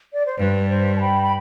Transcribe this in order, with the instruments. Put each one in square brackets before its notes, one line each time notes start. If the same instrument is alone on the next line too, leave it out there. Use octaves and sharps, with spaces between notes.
[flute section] D5
C5
[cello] G2 [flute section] B4
[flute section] C5
A5
G5 B5
B5